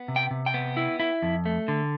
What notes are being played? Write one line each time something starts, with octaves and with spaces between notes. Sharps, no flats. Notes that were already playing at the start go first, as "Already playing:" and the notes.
Already playing: B3
C3
G5
C3
G5
B3
E4
E4
F2
A3
D3